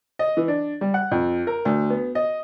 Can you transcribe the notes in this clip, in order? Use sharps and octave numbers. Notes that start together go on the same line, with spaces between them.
D#5
E3
D4
G3
F#5
F2
A#4
D2
B3
D#5